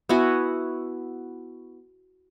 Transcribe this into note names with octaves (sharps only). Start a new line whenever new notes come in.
B3 E4 F#4 G#5